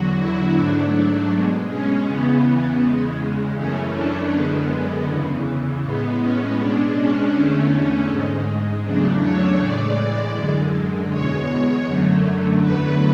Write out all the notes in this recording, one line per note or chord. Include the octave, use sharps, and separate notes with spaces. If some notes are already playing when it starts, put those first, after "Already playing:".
Already playing: E2 D3 F#3 F#4
E4
G#2 F#3 A3 D4
B2 G#3
C#4
E2 C#3 E3 B3
E2 C#3 G#3
F#2 E3 A3 C#4
D4
F#2 D3 G#3 B3
E2 C#3 E3
A2 G#3 B3
C#4
B2 G#3 D4
C#4
E2 D3 A3 C#4
G#2 G#3
E2 C#3 F#3 A3 D4
C#5
A2 E3 G#3 D5
F#2 D3 G#3
E2 B2 G#3 C#5
F#2 D3 F#3 A3
E2 D3 F#3 A3 B4